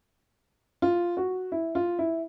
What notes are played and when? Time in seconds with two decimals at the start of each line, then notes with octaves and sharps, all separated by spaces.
0.82 F4
1.17 F#4
1.52 E4
1.75 F4
1.99 E4